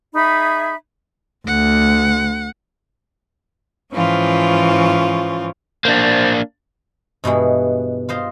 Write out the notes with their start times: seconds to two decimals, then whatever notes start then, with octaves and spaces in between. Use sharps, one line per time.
0.14 D#4 G#4 E5 B5
1.47 D2 F#5
3.92 G#2 E3 F3 C#4 F4
5.85 A#3 D4 C5 D5
7.24 G2 B2 E3 G#3
8.09 F4 C5 D#5